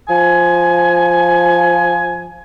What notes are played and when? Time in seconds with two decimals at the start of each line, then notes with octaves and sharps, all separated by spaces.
0.09 F3 G#5